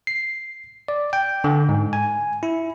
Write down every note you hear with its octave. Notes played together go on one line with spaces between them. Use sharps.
C7
D5
G5
D3
G#2
G#5
E4